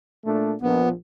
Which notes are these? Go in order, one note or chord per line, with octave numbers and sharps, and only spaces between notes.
A#2 A3 D4
A#1 B3